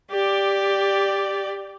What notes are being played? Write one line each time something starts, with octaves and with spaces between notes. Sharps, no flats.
G4 D5